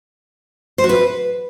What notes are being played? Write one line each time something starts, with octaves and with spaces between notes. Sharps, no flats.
C5
F#4
B4